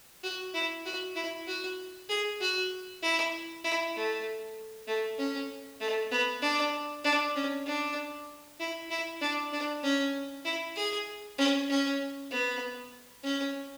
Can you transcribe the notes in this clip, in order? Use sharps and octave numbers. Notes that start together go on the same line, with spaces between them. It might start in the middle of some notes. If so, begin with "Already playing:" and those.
F#4
E4
F#4
E4
F#4
G#4
F#4
E4
E4
A3
A3
C#4
A3
B3
D4
D4
C#4
D4
E4
E4
D4
D4
C#4
E4
G#4
C#4
C#4
B3
C#4